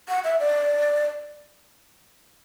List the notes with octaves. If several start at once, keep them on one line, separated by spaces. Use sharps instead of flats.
F#5
E5
D5